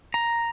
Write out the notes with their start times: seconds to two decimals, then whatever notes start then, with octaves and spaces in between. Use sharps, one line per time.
0.14 A#5